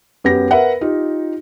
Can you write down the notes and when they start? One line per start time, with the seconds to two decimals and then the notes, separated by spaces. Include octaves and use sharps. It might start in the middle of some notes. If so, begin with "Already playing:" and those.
0.24 F#2 B3 G4 A#6
0.51 A#4 B4 E5 F#5
0.81 D#4 F4 G4